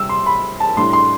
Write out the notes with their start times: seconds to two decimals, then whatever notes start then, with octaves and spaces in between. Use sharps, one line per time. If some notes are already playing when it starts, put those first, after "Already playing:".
Already playing: C3 G3 E6
0.09 C6
0.26 B5
0.60 A5
0.77 A2 G3 D4 C6
0.93 C6